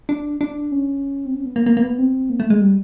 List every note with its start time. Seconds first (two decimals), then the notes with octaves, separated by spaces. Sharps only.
0.09 D4
0.41 D4
0.72 C#4
1.26 C4
1.35 C#4
1.45 B3
1.56 A#3
1.66 A#3
1.77 A#3
1.82 B3
1.98 C4
2.30 A#3
2.40 A3
2.50 G#3
2.61 G3